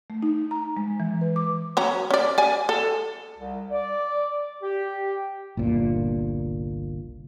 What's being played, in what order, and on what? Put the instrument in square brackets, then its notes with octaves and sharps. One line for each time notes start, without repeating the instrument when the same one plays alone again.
[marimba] A3
D#4
A#5
G#3
E3
B4
D6
[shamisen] F#3 C#4 A#5
C#4 D5
D5 G#5
A4
[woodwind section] C2
D5
G4
[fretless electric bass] G1 C2 A#2